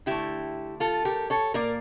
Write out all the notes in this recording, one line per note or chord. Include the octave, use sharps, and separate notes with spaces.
D3 A3 E4 G4
F4 A4
G4 A#4
A4 C#5
A#2 F3 A#3 A#4 D5